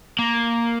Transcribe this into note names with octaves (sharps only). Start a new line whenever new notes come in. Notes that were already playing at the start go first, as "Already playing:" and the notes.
A#3